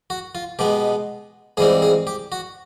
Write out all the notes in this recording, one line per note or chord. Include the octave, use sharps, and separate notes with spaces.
F#4
F4
B2 G#3 B3 G4
G#2 E3 G3 C4 G#4
G#4
G4
F#4